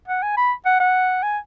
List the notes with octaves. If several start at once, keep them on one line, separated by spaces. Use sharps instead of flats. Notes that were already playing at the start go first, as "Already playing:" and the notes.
F#5
G#5
B5
F#5
F#5
G#5